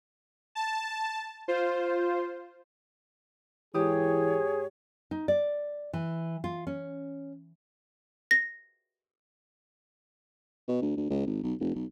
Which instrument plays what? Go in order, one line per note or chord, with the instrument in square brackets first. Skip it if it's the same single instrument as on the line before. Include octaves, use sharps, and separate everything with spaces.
[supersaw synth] A5
F4 C5
[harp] G#2 G4 D#6 [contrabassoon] E3 [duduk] G#4 [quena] C#5
[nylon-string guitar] D#4
D5
E3
F4
C#4
[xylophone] A#6
[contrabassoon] B2
D2
D2
C#2
G#1
B1
F1
B1